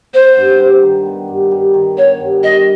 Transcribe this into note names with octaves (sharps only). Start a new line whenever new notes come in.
B3 C5
G2
G3
D#3
B3
G2
G3
D#3
B3 C#5
G2
G3 D#5